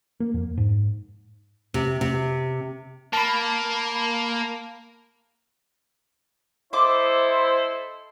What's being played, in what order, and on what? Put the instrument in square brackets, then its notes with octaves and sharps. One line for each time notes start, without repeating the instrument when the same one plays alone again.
[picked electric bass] A#3
F2
G#2
[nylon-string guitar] C3
C3
[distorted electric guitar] A#3 [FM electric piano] A5 B5
[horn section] E4 A4 C5 [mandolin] D#5 D6